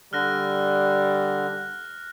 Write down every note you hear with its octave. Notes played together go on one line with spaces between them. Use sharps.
D3 G3 F6 F#6 A#6